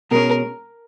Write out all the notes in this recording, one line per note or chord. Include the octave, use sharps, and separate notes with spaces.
B2 G#3 C#4 A#4